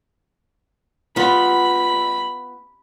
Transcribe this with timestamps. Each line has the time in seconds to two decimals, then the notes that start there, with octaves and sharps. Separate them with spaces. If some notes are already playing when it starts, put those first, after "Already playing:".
1.16 B3 F4 B5